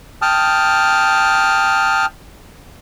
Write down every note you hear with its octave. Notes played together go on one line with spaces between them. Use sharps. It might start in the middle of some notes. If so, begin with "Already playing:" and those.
G5 A5 D#6 F6